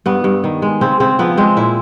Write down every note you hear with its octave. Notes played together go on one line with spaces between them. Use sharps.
G2 B3
G2
D#3
G#3
C#3 C4
C#3 C4
F3 B3
G#3 C4
A#2 E4